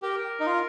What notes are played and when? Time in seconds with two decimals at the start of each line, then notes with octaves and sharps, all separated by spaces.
0.02 G4 A#4
0.40 D#4
0.46 F4